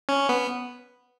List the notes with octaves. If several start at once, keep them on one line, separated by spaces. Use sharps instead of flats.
C#4
B3